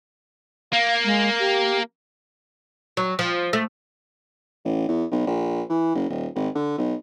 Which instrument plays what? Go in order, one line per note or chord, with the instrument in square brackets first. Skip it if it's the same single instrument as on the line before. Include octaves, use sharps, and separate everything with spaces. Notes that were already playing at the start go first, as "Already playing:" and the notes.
[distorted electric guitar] A#3 [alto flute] F5
[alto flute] G#3
G4
[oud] F#3
F3
A3
[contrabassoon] A1
E2
B1
A#1
E3
F#1
D#1
G#1
D3
B1